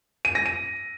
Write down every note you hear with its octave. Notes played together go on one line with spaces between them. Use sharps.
D#7
A#6
D#7